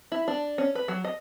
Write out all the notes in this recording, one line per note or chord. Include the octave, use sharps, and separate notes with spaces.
E4
D4
C#4
B4
F#3
D#5